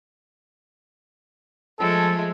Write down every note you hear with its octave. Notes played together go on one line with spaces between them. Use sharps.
F3 G#3 A3 A4